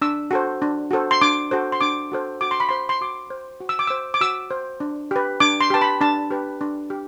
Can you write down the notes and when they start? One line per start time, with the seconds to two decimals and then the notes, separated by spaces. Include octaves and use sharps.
0.02 D4 E6
0.31 F#4 A4 C5
0.62 D4
0.91 F#4 A4 C5
1.11 C6
1.21 D4 D6
1.51 F#4 A4 C5
1.72 C6
1.81 D4 D6
2.12 F#4 A4 C5
2.41 F#4 D6
2.51 C6
2.60 B5
2.69 C5 C6
2.89 C6
3.01 F#4 D6
3.30 C5
3.60 F#4
3.69 E6
3.79 D6
3.87 C5 E6
4.14 D6
4.21 F#4 E6
4.51 C5
4.80 D4
5.11 G4 B4
5.40 D4 D6
5.61 C6
5.70 G4 B4 A5
5.81 B5
6.01 D4 A5
6.31 G4 B4
6.61 D4
6.90 G4